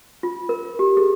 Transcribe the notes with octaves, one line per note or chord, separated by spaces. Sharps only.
F4
A#4
G4
G#4